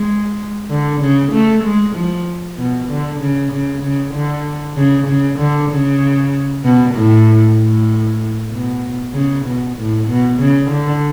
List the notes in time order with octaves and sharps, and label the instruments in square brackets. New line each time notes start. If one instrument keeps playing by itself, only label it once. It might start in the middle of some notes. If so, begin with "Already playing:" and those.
Already playing: [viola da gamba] G#3
D3
C#3
A3
G#3
F3
B2
D3
C#3
C#3
C#3
D3
C#3
C#3
D3
C#3
B2
A2
A2
B2
C#3
B2
A2
B2
C#3
D3